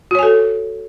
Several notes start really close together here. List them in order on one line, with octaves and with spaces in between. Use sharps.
F#4 C#5 G#5 A4